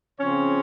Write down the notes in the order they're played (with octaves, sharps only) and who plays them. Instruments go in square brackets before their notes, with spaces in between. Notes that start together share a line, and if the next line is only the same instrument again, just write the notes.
[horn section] C#3 F3 C4 C#4 C#5